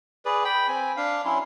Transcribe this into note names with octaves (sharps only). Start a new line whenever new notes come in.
G#4 B4 D5
G5 B5
C4 G#5
D4 F5
F#3 C#4 E4 C6